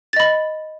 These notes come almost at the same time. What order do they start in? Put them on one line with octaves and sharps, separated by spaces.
A6 D#5 B5